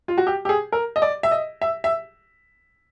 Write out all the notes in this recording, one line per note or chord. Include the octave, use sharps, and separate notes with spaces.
F4
F#4
G4
G4
G#4
A#4
D#5
D5
E5
D#5
E5
E5